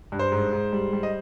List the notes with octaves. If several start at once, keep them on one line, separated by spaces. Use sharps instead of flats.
G2
C5
G#2
G#2
G3
G3
D#5